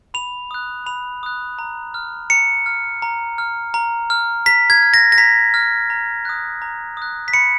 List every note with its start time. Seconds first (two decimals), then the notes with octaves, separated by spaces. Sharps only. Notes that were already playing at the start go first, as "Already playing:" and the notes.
0.14 B5 F7
0.51 D#6 F#6
0.86 B5 F7
1.23 D#6 F#6
1.59 A#5
1.94 F6
2.30 A#5 C#7
2.66 F6
3.02 A#5
3.38 F6
3.74 A#5
4.10 F6
4.46 A#5 B6
4.70 G#6
4.82 F6
4.94 A#6
5.12 A#6
5.18 A#5 B6
5.54 F6
5.90 A#5
6.25 D#6 F#6
6.62 A#5
6.97 D#6 F#6
7.28 B6
7.33 B5 C#7